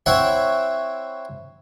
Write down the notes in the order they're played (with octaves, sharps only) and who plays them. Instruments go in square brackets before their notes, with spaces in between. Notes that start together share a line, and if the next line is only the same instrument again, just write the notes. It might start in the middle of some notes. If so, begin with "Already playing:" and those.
[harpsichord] C4 E4 C#5 E5 F#5